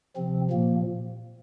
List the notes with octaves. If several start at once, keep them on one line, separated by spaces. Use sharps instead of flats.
C3 F3 C4
A#2 F3 A#3